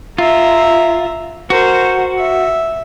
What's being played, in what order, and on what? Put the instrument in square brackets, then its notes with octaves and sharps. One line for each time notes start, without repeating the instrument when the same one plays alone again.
[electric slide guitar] F4 [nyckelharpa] E5 A#5
[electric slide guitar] F#4 [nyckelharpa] A#4 C5
[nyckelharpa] E5